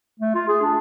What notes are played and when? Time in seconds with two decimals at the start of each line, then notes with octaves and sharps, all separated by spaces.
0.20 A3
0.35 F4
0.48 G#4
0.62 D4